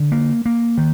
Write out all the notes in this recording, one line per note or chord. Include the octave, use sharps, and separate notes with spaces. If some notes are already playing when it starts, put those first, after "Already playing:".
Already playing: D3
A#3
A#3
D#3